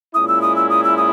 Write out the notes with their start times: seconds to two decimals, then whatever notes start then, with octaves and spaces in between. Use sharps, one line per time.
0.14 A#2 G#3 C#4 E4 D#6
0.28 E6
0.42 D#6
0.56 E6
0.70 D#6
0.84 E6
0.97 D#6